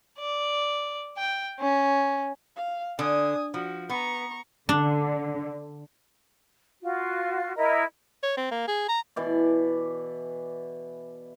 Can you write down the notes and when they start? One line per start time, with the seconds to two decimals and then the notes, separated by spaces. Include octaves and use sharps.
0.18 D5
1.17 G5
1.59 C#4
2.56 F5
2.99 D3 G#5 D#6
3.54 F3 F#4
3.89 B3 A#5 C#6
4.69 D3 D4
6.82 F4 F#4
7.56 E4 A#4 D#5
8.23 C#5
8.37 C4
8.51 A#3
8.68 G#4
8.89 A#5
9.16 B2 E3 D5